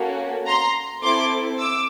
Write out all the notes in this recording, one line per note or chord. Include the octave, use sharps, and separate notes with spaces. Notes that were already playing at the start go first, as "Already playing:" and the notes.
Already playing: A#3 C#4 F#4 A4
A#5 C6
C4 E4 A4 C6 D6
D6 E6